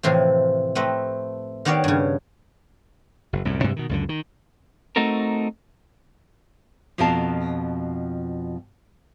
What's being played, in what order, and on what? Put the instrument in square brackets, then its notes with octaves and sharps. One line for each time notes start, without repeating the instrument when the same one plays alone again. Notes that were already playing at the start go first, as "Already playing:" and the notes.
[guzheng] A2 C3 E3 F3
A3 C4 B4 D#5
D#3 B3 G4 C#5 D5 F5
G2 C#3
[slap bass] F#1
C2 F#2 A2
G2 C3 G3 G#3
B2 D#3
C#2 F#2 D3
D#3
[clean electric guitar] A3 C4 D#4 F#4 A4 A#4
[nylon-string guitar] F2 B2 F3 A#4 F5 A5